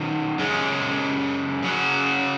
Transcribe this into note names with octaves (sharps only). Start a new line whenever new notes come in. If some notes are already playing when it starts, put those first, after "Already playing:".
Already playing: D#3 F#3 C#4
F#2 C#3 G#3 C#4
C#3 F#3 C#4 F#4